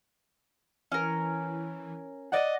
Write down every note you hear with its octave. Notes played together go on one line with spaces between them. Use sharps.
E3 C#4 A#4
D5 D#5 F#5